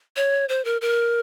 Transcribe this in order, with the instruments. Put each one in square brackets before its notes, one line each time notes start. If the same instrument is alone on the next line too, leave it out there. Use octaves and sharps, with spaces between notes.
[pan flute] C#5
C5
A#4
A#4